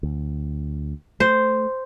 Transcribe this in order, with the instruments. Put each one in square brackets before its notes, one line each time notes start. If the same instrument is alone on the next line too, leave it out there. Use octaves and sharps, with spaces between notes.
[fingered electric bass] D2
[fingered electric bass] A3 [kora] C5